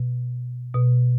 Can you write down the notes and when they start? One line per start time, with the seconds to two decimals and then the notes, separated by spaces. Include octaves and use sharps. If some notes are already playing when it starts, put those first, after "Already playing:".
Already playing: B2
0.74 B2